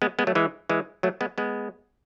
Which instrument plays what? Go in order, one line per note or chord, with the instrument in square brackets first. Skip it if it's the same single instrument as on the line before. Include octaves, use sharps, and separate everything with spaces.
[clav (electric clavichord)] G#3 B3
G#3 B3
F#3 A3
E3 G#3
E3 G#3
F#3 A3
G#3 B3
G#3 B3